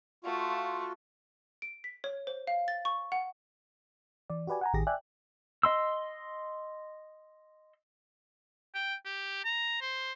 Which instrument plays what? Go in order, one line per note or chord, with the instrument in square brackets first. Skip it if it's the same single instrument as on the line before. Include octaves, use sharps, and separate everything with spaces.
[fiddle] A3 [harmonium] F4 F#4
[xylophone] D7
B6
C#5
C5
F5
A6
C#6
F#5
[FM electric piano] E3 D5
F#4 G4 B4 D5 G#5
F#5 G#5 A#5
A1 D#3 G4 G#4 A#6
D5 E5 G5 G#5 F#6
[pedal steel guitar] D#5 C6 E6
[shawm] G5
G4
A#5
C5